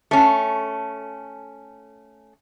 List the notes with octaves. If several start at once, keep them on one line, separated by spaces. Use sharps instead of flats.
A3 C#4